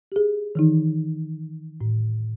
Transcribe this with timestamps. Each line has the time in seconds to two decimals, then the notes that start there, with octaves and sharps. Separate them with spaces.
0.12 G4 G#4
0.55 D#3 E3 D#4
1.81 A2